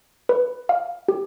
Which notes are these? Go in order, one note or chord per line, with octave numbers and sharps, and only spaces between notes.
B4
F5
G4